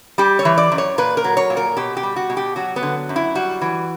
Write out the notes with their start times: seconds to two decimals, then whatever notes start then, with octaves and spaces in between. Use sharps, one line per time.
0.18 G3 G4
0.39 C#5
0.45 E3
0.58 D5
0.72 F#2
0.78 C#5
0.98 A#2 B4
1.17 A#4
1.24 F#3
1.37 C#5
1.50 A#2
1.57 A#4
1.77 B2 G4
1.97 G4
2.03 G3
2.16 F#4
2.30 B2
2.37 G4
2.56 F#3 F#4
2.76 B3
2.83 D3
3.09 F#2
3.16 E4
3.35 G3 F#4
3.61 E3